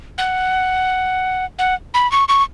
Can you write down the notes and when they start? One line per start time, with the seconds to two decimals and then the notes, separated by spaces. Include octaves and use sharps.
0.18 F#5
1.59 F#5
1.94 B5
2.12 C#6
2.28 C#6